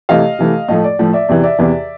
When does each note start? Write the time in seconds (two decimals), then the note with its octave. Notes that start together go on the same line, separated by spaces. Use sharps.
0.09 C3 E3 A3 D#5 F5
0.39 C3 E3 A3
0.68 A2 F3 A3 D#5
0.84 D5
0.99 A2 F3 A3
1.13 D5 E5
1.28 E2 C3 E3 D5
1.43 D5 E5
1.59 E2 C3 E3